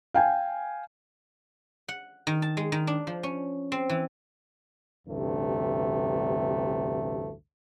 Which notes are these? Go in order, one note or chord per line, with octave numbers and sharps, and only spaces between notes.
F5 G5 G#5
F#5
D#3
A5
G#3
D#3
D4
F3
C#4
C4
E3
A1 D2 G2 C3 A3